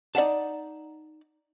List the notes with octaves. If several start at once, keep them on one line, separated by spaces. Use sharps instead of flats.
D#4 D5 F5 F#5 A5